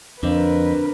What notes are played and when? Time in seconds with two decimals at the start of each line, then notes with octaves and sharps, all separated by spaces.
0.23 F2 D3 C4 A#4 B4